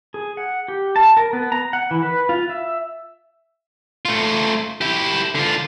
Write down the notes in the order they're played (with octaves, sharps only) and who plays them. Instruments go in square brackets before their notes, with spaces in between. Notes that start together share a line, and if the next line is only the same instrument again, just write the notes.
[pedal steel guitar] G#4
F#5
G4
A5
A#4
B3
A#5
F#5
E3
B4
F4
E5
[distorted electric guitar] A3 F4
E4 G4
D3 F4